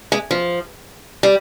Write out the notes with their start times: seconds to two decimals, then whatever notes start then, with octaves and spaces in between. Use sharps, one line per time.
0.12 G#3
0.31 F3
1.23 G3